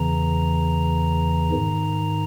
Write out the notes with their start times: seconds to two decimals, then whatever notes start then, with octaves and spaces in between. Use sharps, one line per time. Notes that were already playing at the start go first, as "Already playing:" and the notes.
Already playing: E2 C#3 E3 A#5
1.52 G#2 D#3